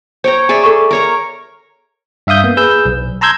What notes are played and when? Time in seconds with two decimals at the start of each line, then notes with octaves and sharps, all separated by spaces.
0.24 C5 C#5 G5 A#5
0.49 G#4 D5 E5
0.64 A4 C#6
0.91 A#4 C#5 A#5
2.27 G2 E5 F5 D#6 G6
2.44 A#3 B3
2.57 G#4 B4 E6 G6
2.85 B1
3.21 A5 A#5 C6 E6 G6 G#6